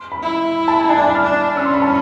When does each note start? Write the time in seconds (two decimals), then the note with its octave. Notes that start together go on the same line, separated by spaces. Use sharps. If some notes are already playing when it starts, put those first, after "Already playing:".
Already playing: C6
0.12 B5
0.22 E4
0.68 A5
0.78 G#5
0.90 D4 G#5
0.98 A5
1.06 B5
1.15 F6
1.23 D4
1.57 C#4 E6
1.66 C6
1.74 B5
1.82 A5